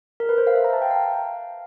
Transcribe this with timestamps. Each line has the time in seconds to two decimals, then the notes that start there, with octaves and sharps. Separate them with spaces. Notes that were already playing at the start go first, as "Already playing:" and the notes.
0.20 A#4
0.29 B4
0.38 C5
0.47 F5
0.55 E5
0.64 A#5
0.73 A5
0.82 G5
0.91 F5